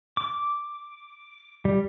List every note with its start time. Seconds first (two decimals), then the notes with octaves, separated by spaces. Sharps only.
0.17 D6
1.65 G3